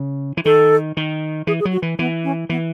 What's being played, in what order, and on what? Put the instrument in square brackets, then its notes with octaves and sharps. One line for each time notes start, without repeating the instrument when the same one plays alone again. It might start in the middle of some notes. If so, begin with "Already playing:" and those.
Already playing: [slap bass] C#3
E3
[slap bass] D#3 [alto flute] A4
[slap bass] D#3
[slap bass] E3 [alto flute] G#4
[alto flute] G#4
[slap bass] F#3
[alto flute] F#4
[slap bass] E3
[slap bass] E3 [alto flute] B3
[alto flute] C#4
[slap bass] E3 [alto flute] B3